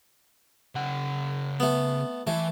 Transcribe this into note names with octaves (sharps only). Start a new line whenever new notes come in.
C#3 F#5
A3 B3
E3 A3 G#5